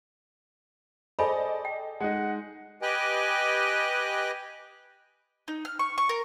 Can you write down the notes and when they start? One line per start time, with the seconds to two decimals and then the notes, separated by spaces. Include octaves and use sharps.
1.19 G#4 A4 C5 D5 D#5 G#5 B5
1.65 G5
2.00 G#3 D#4 F#5
2.82 G4 B4 D#5 G5 G#5 F#6
5.48 D#4
5.65 F6
5.79 C#6
5.98 C#6
6.09 A#4